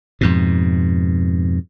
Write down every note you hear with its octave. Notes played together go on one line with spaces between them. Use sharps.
F2 G#2 B2